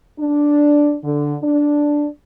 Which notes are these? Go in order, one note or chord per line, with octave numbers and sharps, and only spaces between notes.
D4
D3
D4